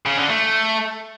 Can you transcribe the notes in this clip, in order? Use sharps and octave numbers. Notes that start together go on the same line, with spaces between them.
C#3
D3
A3